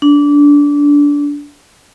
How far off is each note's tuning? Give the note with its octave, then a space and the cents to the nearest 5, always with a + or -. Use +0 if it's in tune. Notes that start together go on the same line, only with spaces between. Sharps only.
D4 -20